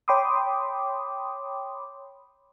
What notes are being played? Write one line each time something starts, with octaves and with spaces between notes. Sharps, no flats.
C#5 G5 B5 C6 D6 D#6